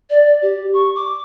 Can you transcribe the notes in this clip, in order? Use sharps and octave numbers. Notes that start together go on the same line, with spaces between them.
D5
G4
C#6
D6